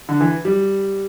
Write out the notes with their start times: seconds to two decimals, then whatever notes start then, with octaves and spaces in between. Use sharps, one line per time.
0.09 D3
0.21 E3
0.45 G3